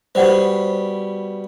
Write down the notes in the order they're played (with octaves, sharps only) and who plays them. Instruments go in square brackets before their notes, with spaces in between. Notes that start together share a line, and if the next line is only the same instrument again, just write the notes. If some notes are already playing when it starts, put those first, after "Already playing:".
[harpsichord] B2 G3 [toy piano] C5 F#5